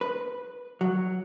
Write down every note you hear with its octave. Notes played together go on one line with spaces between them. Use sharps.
B4
F#3